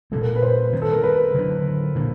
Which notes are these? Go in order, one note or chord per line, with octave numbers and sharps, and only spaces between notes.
A#2 G3 C4 A4
A#4
B4
C5
D#3 G3 C4
A4
A#4
B4
D3 F#3 B3 D4
A#2 G3 A#3 D4